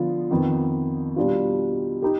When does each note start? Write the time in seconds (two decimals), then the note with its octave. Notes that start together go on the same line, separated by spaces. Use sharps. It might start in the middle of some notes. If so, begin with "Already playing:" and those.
Already playing: D3 F3 B3 F4
0.30 F2 D#3 B3
1.16 B2 G3 D4 F4
2.02 D#4 G4